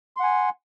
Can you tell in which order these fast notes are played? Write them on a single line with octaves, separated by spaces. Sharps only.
C6 F#5 G#5